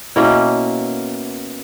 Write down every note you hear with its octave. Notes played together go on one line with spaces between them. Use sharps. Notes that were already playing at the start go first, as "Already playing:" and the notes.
B2 A#3 C#4 E4